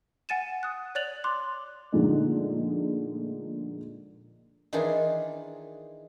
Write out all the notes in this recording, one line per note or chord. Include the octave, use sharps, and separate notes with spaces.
F#5 G#5 A6 D#7 E7
D#6 F#6
C#5 D5 F#6 A6 F7 F#7
C6 D6 F#6
A#2 D3 F3 G#3 A3 D#4
D#3 E3 D4 D#4 F4 G#4